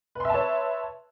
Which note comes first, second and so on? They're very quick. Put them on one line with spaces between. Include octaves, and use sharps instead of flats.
B4 C6 E5 A5 C#5